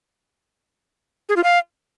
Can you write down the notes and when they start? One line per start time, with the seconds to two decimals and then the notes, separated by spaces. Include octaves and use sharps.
1.29 G#4
1.36 F4
1.44 F5